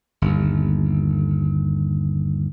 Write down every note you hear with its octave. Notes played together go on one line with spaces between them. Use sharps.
G1 D#2